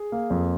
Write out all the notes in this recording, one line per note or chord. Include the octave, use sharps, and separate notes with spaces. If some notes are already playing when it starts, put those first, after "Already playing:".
Already playing: G#4
A#3
F2